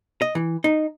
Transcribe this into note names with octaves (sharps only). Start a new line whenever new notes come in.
D#5
E3
D#4